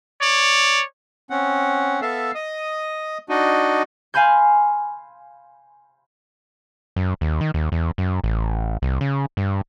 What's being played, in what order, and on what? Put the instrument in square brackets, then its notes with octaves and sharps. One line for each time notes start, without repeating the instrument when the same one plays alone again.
[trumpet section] C#5 D5
[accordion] C4 C#4 F#5
B3 A4 E5 F5
D#5 D#6
D4 D#4 F#4 D#5
[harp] F5 G#5 B5 C6 G6
[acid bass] F#2
D#2
D#3
D#2
E2
F#2
A1
C2
C#3
G2